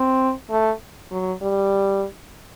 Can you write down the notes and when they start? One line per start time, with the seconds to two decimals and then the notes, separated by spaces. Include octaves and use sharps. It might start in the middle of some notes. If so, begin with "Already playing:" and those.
Already playing: C4
0.50 A3
1.11 F#3
1.42 G3